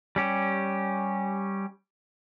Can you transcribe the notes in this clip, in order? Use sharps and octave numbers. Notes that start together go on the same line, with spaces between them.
G3 C#4 G4